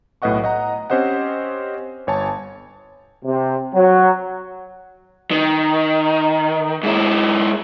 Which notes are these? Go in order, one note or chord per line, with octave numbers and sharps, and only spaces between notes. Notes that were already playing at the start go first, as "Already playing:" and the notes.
B1 A2 B4 D#5 F#5 C#6
D#5 F#5 A#5
C4 C#4 G4 C5 D#5 F#5
G1 C#5 G#5 A5
C3
F#3
D#3
G#2 E4